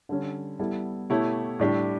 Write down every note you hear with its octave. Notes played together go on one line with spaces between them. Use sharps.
D3 G3 C#4
G3 B3 E4 A4
B2 A3 E4 G4 C#5
A2 G3 D4 G4